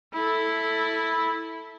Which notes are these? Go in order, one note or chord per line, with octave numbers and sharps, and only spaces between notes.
E4 A4